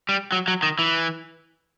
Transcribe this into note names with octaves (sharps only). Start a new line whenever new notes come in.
G3
F#3
F#3
D#3
E3